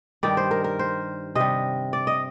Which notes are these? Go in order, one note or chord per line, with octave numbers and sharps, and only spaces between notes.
G2 D#3 G3 D5
C5
A#4
A#4
C5
C3 G3 D#5
D5
D#5